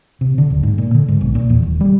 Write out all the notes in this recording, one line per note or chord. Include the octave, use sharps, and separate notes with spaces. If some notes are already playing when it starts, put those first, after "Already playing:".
C3
D3
D1
G#2
A#2
D3
G#2
B1
A#2
E2
D#1
G3